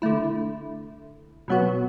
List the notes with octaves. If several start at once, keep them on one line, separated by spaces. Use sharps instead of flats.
D3 A3 E4
B2 F#3 B3 F#4